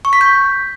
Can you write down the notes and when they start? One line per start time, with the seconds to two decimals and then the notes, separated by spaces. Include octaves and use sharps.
0.05 C#6
0.13 B6
0.21 G6